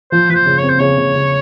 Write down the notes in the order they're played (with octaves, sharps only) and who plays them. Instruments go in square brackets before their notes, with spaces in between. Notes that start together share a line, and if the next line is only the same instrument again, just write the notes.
[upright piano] F3 [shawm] C5
[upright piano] F3 [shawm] B4
[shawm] C5
[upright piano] C#3
[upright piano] C4 [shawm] C#5
[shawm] C5
[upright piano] C#3 [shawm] C#5
[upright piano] C#3
C#3